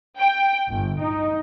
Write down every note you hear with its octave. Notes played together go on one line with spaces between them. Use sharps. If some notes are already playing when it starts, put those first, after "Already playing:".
G5
G1
D#4